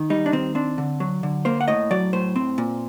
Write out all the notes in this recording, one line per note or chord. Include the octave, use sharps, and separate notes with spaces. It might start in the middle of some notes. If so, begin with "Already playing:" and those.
Already playing: D#3
G3 D#4
D4
D#3 C4
C4 D4
D3
F#3
D3
A#3 C5
F#5
A2 D#5
F#3 D5
A2 C5
C4
A#2